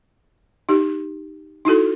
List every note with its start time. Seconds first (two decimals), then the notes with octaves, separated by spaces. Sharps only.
0.69 D#4 G4
1.65 D#4 E4 F#4 A4